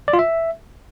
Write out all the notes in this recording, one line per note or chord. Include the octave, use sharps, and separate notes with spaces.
D5
F4
E5